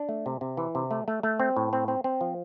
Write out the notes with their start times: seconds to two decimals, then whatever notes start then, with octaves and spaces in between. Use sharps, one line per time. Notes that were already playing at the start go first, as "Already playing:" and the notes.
Already playing: D4
0.09 A3
0.26 C3
0.41 C3
0.57 E3
0.75 C3
0.91 A3
1.08 A3
1.23 A3
1.40 C4
1.56 A2
1.73 C4
1.88 C4
2.04 C4
2.21 F3